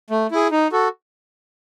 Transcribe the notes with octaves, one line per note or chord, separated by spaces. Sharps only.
A3
E4 G#4
D#4
F#4 A4